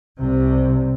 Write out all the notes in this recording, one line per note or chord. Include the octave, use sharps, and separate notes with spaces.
C2 C3